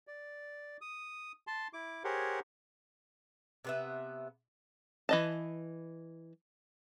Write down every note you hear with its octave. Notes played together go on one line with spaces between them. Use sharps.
D5
D#6
A5 C6
E4 D6
G4 G#4 A#4 C5 C#5 F#5
C3 B3 E5
E3 D#5 A5